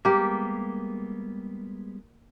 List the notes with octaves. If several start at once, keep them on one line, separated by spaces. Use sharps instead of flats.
G3 G#3 A#3 B3 G4